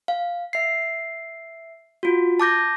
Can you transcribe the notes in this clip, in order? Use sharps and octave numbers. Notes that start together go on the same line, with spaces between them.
F5
E5 C7
F4 F#4
A5 D6 G6 A#6